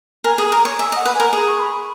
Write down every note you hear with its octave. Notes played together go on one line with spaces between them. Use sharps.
A#4 G#5
G#4
A#4 A#5
C#5
E5 G#5
D#5
F#5
B4
G#5
A#4
G#4 A#5
C#6
B5